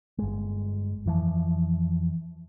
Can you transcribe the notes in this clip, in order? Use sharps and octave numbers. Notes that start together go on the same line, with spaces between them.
G1 G#3
F2 E3 F3